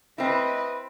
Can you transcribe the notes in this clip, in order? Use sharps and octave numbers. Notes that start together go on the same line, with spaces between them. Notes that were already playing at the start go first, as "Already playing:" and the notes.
C4 E4 B4 D#5